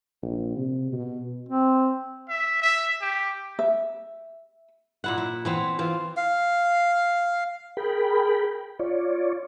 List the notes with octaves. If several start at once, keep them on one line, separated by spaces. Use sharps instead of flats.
A#1
C3
B2
C4
E5
E5
G4
E5
A#2 E4 F#5
E4
E3 B3 C4
E3 C4 F4
F5
G#4 A#4 G5 B5
F4 C#5 D5